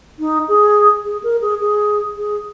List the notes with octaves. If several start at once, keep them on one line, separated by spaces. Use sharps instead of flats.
D#4
G#4
G#4
A#4
G#4
G#4
G#4